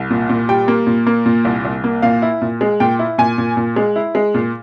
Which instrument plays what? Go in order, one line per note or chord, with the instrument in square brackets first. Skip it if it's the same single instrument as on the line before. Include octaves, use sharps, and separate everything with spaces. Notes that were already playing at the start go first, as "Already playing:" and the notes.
Already playing: [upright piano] C2
A#2
A#2
G3 G5
A#3
A#2
A#3
A#2
C2
C2
A#3
A#2 F5
E4
A#2
G#3
A#2 G5
E4
A#2 G#5
A#2
A#2
G#3
E4
G#3
A#2